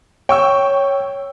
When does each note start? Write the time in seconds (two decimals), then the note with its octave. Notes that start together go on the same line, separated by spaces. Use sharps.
0.29 C#5 G5 C#6 E6